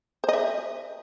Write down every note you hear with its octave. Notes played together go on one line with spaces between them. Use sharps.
C5 D#5 E5